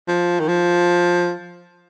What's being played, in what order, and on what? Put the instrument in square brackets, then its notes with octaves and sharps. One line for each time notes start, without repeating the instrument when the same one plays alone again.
[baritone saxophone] F3
D#3
F3